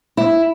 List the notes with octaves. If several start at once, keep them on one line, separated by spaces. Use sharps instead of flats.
E4